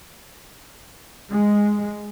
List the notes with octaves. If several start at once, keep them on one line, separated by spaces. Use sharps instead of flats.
G#3